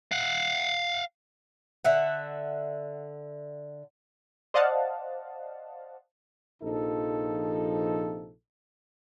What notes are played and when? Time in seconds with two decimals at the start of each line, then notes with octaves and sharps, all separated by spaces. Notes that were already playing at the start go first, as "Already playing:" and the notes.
0.12 F5 F#5
1.84 D3 E5 F#5
4.54 C5 D5 D#5 F5 F#5 A5
6.63 A#1 C3 F3 D#4 A4